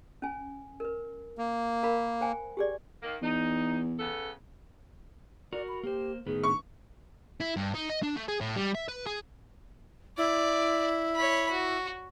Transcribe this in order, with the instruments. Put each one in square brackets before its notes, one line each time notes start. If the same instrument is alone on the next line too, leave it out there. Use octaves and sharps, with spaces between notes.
[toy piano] C#4 G#5
A#4 B4
[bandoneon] A#3
[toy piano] A#4 F5 B5
C5 G5 G#5
G4 G#4 D5
[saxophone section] D#3 A#3
[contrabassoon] E2 [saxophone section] D#4
[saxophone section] C#3 B3 A4
[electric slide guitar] F#4 A#4 [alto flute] D5
[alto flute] B5
[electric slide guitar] A#3 C5 [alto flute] G4
[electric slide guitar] A2 D#3 B3 [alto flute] G#4
[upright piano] C#6
[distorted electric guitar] E4
G2
D#4
D#5
D4
A3
G#4
A2
G3
E5
B4
G#4
[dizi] E4 [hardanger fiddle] D5
[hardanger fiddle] C#5 B5
F#4